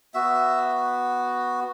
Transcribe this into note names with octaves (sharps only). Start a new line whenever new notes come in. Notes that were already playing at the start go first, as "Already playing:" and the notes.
B3 F#4 E5